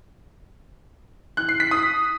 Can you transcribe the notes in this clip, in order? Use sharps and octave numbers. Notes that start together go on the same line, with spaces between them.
F#6
C7
B6
D#6